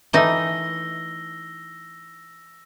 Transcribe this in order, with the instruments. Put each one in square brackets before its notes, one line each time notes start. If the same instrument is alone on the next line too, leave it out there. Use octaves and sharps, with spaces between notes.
[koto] E3 A3 D#4 [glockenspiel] E6 A#6 G7